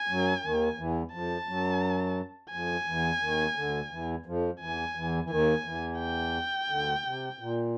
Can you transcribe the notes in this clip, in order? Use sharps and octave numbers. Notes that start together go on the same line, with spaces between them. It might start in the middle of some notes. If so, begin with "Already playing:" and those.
Already playing: G#5
F#2 F#3
D#2 D#3
E2 E3
F2 F3 A5
F#2 F#3
F2 F3 G#5
E2 E3
D#2 D#3
D2 D3
E2 E3
F2 F3
E2 E3 G#5
E2 E3
E3
D#2 D#3 G#5
E2 E3
G5
D2 D3
C3
A#2